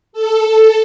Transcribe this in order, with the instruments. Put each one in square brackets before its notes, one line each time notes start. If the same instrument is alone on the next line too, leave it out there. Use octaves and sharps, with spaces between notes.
[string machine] A4